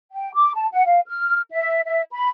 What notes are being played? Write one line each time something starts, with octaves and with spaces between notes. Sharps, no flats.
G5
D6
A5
F#5
F5
F6
E5
E5
B5